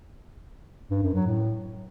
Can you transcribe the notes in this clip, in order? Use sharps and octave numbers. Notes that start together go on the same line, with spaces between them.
G2
F#2
F#3
A2